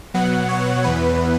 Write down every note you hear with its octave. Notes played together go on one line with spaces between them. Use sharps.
B2 F#3 B3 F#5
C#5
E2 E3 B3 B4